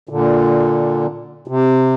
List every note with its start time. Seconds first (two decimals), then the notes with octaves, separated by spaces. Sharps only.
0.09 A#2 D3
1.48 C3